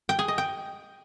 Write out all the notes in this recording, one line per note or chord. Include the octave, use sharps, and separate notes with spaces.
G5
G#4
D#5
G5